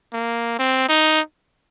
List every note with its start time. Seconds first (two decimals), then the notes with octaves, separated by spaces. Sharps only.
0.13 A#3
0.59 C4
0.89 D#4